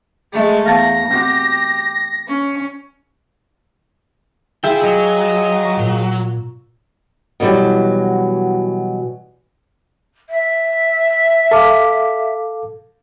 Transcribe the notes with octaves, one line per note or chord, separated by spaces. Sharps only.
G#3 A3
E2 F5 A5 A#6
C4 F#4 G4
C#4
E4 F4 G#4 E5 G5
F#3 D#5
A#5 C#6 E6
A#2
B2 E3 F#3 G3
E5
A4 F5 D6